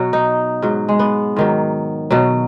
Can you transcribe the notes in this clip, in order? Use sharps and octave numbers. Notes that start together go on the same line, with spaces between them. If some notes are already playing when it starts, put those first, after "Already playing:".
Already playing: B2 F#3 F#4
D#4
G#2 F#3
G#3
B3
G#2 D#3 F#3
B2 F#3